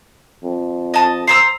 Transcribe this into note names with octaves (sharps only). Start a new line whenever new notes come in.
F2
D#5 A5
C5 A#5 E6